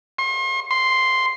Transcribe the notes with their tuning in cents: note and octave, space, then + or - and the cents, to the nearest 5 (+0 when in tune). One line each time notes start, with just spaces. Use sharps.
C6 +40
C6 +0